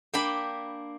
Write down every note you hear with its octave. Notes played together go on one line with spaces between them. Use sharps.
A#3 D4 G5 B5